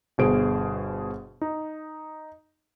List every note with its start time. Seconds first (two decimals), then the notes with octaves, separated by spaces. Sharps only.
0.18 G1 B2 G#4 C5 D7
1.41 D#4